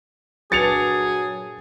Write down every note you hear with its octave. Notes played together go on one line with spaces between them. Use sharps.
G2 A#2 F#3 D4 G#4 A6 C#7 F7